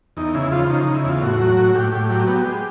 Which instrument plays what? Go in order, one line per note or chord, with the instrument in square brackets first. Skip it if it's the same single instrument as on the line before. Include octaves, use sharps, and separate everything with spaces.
[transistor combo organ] E2 D#4
C#3 E4
F3 F4
C#3 D#4
C#3 D#4
E4
E2 F4
A2 F#4
F#3
A2
A2 G4
A2 G4
F#3 G4
B3 G4
G#3